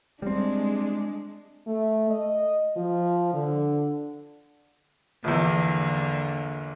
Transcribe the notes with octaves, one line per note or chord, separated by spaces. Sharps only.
G3 G#3 C4 D4
A3
D#5
F3
D3
A#1 E2 D3 A#3